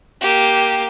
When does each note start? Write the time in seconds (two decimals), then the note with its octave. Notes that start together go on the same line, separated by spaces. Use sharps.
0.21 A#3 G4